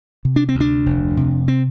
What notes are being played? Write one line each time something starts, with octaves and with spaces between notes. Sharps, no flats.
C3
D4
C4
D2
D4
F1
C3
C4